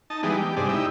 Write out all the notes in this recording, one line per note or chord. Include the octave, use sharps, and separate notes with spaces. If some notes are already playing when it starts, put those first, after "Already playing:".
D#4 A5
E3 G3 G#3 B3 D#4
G4
G2 C3 G#3 D4
D#4 E4 G4